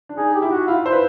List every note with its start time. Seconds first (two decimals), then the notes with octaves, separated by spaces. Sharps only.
0.09 D4
0.17 D#4 G#4
0.34 G4
0.42 E4
0.51 F#4
0.67 E4 F4
0.84 E4 C5
0.92 B4